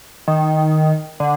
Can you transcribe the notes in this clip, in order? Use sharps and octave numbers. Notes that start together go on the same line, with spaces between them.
D#3
D3